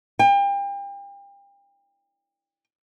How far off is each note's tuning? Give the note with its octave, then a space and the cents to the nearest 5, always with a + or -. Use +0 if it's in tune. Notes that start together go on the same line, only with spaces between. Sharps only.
G5 +35